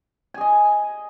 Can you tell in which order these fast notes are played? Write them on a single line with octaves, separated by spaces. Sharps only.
G#5 G#4 D#5